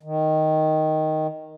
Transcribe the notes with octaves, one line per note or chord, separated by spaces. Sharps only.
D#3